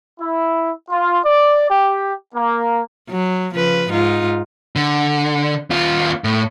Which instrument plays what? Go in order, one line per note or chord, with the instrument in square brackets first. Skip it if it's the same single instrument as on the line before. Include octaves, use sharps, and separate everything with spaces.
[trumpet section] E4
F4
D5
G4
A#3
[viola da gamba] F#3
C#3 F3 B4
G#2 D#4 F4
[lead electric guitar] D3
D#2 F4
A2